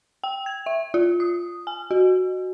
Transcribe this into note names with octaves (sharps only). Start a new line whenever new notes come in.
G5
G#6
E5
F4
D#6
G#5
F#4